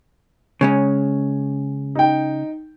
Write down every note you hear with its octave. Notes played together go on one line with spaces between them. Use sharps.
C#3 G#3 C#4
D#4 G5